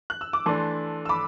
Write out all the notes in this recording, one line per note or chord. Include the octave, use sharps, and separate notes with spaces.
F#6
E6
D6
E3 A3 D4 A5 C6
E6
B5 D6